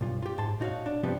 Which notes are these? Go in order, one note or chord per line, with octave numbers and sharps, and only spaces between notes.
B1 G2 F4
F4 G4
G#2 A5 C6
A#2 D#4 F#4 C#5 F5
D4
G2 C3 F3 G3 B3 C4